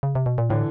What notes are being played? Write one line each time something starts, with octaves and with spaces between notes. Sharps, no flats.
C#3
C3
B2
A#2
A2 D3 E3